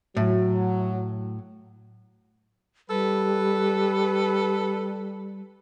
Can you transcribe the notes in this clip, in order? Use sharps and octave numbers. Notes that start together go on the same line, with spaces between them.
A2 F#3
G3 A4 B4